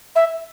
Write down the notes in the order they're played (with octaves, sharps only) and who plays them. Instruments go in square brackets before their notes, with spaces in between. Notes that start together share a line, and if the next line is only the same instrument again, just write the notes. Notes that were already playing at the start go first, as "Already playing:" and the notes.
[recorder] E5